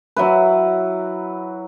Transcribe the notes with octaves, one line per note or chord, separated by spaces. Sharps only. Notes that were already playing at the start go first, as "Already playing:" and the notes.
F#3 E4 B4